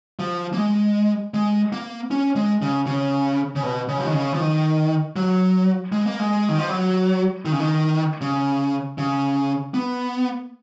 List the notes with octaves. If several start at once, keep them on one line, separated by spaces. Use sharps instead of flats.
F3
A#3
G#3
G#3
A#3
C#4
G#3
C#3
C#3
C#3
B2
C#3
F3
D#3
C#3
F3
D#3
F#3
G#3
A#3
G#3
D#3
F3
F#3
D#3
C#3
D#3
C#3
C#3
B3